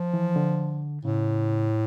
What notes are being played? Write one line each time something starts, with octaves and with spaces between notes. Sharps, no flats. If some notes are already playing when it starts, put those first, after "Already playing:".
Already playing: F3
E3
D3
A2 C#3